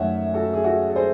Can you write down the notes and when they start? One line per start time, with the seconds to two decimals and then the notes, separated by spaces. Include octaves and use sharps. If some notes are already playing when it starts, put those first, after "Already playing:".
Already playing: F#2 D#3 F#3 A3 C#5 E5 F#5
0.34 F#4 A4
0.54 G#4
0.64 F#4 A4
0.89 A4
0.96 G#4 C5